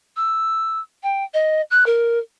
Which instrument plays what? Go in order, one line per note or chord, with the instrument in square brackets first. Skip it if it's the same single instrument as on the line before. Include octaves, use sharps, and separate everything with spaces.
[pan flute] E6
G5
D#5
F#6
A#4